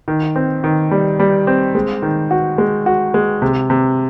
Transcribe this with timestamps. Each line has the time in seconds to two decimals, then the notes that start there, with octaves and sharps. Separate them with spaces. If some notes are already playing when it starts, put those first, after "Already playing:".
0.08 D#3
0.36 C4
0.64 D#3
0.91 G3
1.20 G3
1.47 C4
1.75 G#3
2.02 D#3
2.31 F#4
2.58 G#3
2.86 F#4
3.14 G#3
3.42 C3
3.70 C3